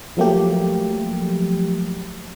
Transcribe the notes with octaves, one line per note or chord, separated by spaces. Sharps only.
F3 F#3 A3 A#3 G4